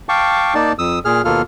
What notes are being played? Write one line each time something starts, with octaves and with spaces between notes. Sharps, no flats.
F5 G5 A5 C#6 D6
A#3 D#4 D5 A5
F2 D#6 E6
A#2 G#4 F6
D#2 B2 A#3 F4 A4 F6